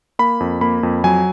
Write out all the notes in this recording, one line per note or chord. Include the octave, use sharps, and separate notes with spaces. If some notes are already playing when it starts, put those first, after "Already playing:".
A#3 B5
F2
A#3 B5
F2
F#3 G#5